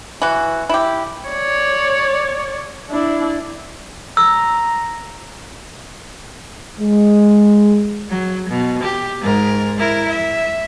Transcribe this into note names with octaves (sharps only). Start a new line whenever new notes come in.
E3 F#4
E4 G4
C#5 D5
D4 E4
A#5 E6
G#3
F#3
B2
G4
G#2 A#4
E4 A#4
E5